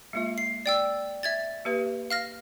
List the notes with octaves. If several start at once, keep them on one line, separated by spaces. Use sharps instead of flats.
G#3 A#3 F4
C7
D5 G5 E6
E5 G#6 A6
A#3 G4 B4
F5 F6 A#6